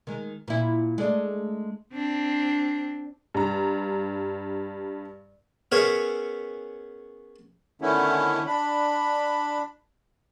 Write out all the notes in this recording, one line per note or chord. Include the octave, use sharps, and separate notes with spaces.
D#3 G#3
A#2 E4
G#3 A3 D4
C4 D4
G2 A#5
B3 C#4 G#4 A#4 C#5 E5
D3 D#3 A3 B3 C#4 E4
D4 B5